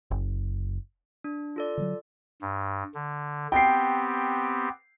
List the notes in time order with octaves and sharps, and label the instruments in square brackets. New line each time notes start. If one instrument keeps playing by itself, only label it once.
[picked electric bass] F#1
[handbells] D4
F4 A4 D5
[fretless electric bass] D3 F3 F#3
[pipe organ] G2
D3
[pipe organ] B3 C4 G4 [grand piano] G5 C7